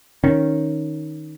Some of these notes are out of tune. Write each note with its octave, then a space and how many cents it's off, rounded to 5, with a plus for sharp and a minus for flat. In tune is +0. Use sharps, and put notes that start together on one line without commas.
D#3 +0 C#4 +0